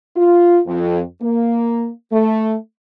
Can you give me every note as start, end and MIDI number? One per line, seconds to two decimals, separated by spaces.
0.16 0.59 65
0.66 1.00 41
1.21 1.89 58
2.12 2.54 57